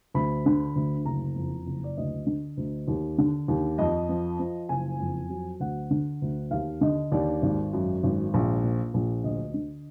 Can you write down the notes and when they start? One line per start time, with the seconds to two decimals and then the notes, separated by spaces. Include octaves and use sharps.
0.14 D2 B5
0.46 D3
0.76 D2
1.05 F#1 A#5
1.36 F2
1.66 F#1
1.84 D5
1.97 D2 D#5
2.27 D3
2.57 D2
2.88 D#2
3.18 D3
3.48 D#2
3.78 F2 D#5
4.09 F3
4.40 F3
4.69 F#1 G#5
5.00 F2
5.30 F#3
5.60 D2 F#5
5.91 D3
6.22 D2
6.51 D#2 F5
6.81 D3 D#5
7.12 D#2 D5
7.42 G#1
7.73 F#2
8.03 G#1
8.34 A#1
8.64 A#2
8.94 A#1
9.24 D2 D#5
9.54 D3